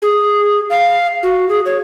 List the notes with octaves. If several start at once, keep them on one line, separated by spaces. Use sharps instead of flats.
G#4
F5
F#4
G#4
C#5